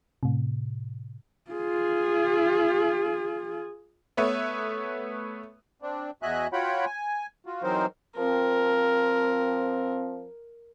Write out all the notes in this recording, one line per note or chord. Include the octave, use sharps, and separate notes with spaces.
A2 C3
F4 G#4
A3 B3 B4 C#5 E5
C4 D4
E2 F#4 D#5 E5 G#5 F#6
F4 F#4 C#5 F#5 G5 B5
G#5
F4 F#4
E3 F#3 C4 D#4 A#4 C5
F3 C4 A#4